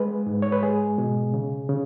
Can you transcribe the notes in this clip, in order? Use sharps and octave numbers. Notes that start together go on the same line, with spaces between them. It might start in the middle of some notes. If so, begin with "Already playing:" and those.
Already playing: G#3 B4
G#2
C#5
B4
G#3 G#4
B2
C#3
C#3